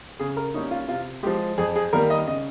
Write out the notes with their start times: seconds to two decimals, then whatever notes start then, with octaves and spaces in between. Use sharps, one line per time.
0.20 C#3 G#4
0.37 A#4
0.54 G3 A#3 C#4 D#4
0.71 F4
0.89 C3 F4
1.23 F3 G#3 G4
1.58 F2 G#4
1.76 G#4
1.93 D#3 G3 A#3 A#4
2.10 D#5
2.27 C#3 D#5